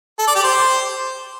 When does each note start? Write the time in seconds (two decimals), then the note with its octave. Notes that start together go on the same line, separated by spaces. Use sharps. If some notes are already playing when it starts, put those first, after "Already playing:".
0.19 A4
0.27 D5
0.35 G4
0.44 C5